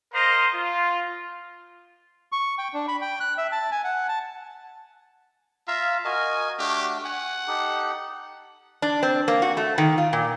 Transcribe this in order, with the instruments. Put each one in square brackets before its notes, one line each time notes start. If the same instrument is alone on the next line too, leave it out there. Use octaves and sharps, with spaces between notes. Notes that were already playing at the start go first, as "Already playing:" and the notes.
[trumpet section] A#4 C5 D#5 F5 A#5
F4
[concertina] C#6
G5
D4
B5
G5
F#6
E5
A5
G#5
F#5
A5
[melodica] F4 F5 A#5 [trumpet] E5
[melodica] F#4 A#4 D#5 [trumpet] G#5
[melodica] A3 D4 F#4 [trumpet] G4
[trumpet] F#5 [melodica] G#5
[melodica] D#4 G4 A4
[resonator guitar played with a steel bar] D4
C4
A#3
F#4
A3
D#3
F4
A#2